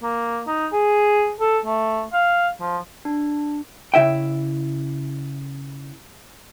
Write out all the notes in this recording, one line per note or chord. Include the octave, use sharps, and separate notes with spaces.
A#3
D#4
G#4
A4
A3
F5
F3
D4
C#3 E4 E5 G5